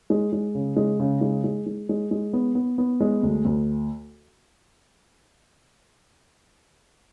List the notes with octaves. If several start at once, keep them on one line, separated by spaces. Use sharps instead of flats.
G#3
G#3
C#3
G#3
C#3
G#3
G#3
G#3
G#3
G#3
B3
B3
B3
G#3
D2
D2